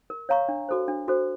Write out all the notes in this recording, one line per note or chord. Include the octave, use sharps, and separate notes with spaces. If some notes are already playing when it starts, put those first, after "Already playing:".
A#4
C#5 F5 A#5 C#6
D4
F#4 A4 C5
D4
F#4 A4 C5